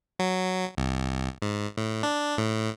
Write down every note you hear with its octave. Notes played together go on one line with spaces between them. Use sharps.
F#3
C2
G#2
A2
D4
A2